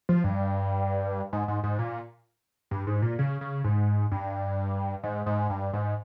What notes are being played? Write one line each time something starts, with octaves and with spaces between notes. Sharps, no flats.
F3
G2
G#2
G#2
G#2
A#2
G2
G#2
A#2
C#3
C#3
G#2
G2
G#2
G#2
G2
G#2